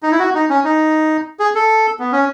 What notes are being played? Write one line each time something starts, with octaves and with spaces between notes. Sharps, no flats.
D#4
E4
F#4
D#4
C#4
D#4
G#4
A4
B3
C#4